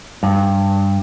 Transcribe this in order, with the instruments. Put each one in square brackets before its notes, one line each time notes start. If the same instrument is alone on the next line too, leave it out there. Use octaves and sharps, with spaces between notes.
[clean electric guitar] G2